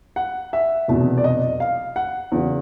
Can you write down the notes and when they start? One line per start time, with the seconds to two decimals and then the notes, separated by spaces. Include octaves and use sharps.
0.16 F#5
0.53 E5
0.88 F1 E2 B2 F#3
1.18 D5
1.24 D#5
1.60 F5
1.96 F#5
2.32 E2 C#3 F#3